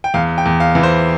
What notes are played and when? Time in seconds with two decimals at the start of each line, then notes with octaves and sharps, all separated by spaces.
0.04 G5
0.14 E2 F5
0.38 G5
0.46 E2
0.60 F5
0.75 E3
0.83 C5